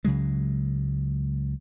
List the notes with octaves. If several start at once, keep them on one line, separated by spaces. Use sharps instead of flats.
C#2 C#3 F#3 G#3